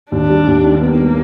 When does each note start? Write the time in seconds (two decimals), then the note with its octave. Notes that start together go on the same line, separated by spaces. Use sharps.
0.12 D#2 D4
0.30 G3
0.47 D#2
0.64 D#3
0.81 A#3 B3
0.99 G3